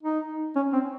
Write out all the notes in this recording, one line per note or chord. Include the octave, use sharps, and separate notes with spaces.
D#4
C#4
C4